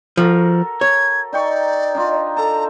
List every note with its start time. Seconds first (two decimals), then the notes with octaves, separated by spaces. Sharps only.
0.17 F3 F#4 A4 A#4
0.81 C#5 G#6
1.33 D#4 D5 G5 C#6
1.95 D4 D#4 F4
2.37 A4 A5 A#5